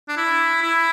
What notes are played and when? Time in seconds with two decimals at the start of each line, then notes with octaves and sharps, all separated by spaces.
0.08 D4
0.17 E4
0.62 E4